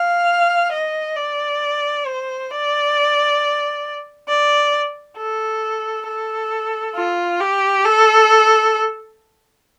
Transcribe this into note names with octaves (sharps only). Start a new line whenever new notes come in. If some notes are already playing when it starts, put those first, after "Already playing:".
Already playing: F5
D#5
D5
C5
D5
D5
A4
A4
F4
G4
A4